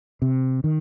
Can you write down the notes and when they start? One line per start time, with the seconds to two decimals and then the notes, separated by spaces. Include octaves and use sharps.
0.22 C3
0.64 D#3